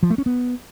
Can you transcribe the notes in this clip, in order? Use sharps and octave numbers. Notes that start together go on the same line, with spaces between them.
F3
A3
C#4
B3